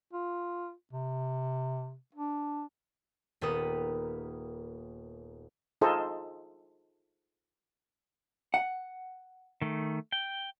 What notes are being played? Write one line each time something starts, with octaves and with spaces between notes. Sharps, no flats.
F4
C3
D4
D#1 A#3 B3 G4 B4 D#6
D#4 F4 G#4 A4 C5 D#5
F#5
D#3 A3
G5